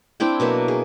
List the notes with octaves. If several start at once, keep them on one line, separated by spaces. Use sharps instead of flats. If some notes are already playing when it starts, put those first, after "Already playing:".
C4 D4 E4 G5
B2 F#3 A#3 E5
G#4